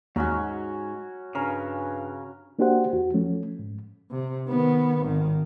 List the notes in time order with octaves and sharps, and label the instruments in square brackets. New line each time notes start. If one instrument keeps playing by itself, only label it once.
[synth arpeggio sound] D#2 [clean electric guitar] G#2 [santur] F#3 C#4 F#4
[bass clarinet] G2 [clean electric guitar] C#3 [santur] C#4 A#4
[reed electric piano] A#3 D4 F#4 G4 C5 F#5
E2 F#4
F3 A3 C#4
G#2
[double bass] C3
D#3 B3
G#1 D#3